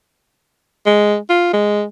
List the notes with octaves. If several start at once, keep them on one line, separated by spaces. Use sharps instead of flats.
G#3
F4
G#3